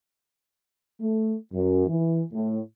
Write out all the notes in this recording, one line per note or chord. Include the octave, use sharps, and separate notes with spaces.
A3
F#2
E3
A2